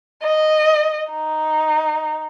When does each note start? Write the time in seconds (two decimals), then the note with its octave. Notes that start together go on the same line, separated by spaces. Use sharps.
0.23 D#5
1.11 D#4